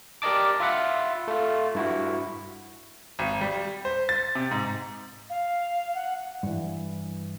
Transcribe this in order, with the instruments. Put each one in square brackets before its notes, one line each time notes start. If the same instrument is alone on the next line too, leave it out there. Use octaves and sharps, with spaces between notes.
[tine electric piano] G4 A#4 D5 D#5 A5 D6
F4 E5 F#5 B5
A3 F4
G2 E4 F#4
[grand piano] G#1
G3
C5
A6
C3
G#2
[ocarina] F5
F#5
[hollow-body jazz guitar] G2 E3